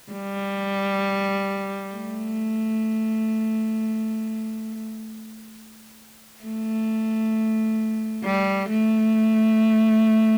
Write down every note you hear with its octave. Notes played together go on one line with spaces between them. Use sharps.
G3
A3
A3
G3
A3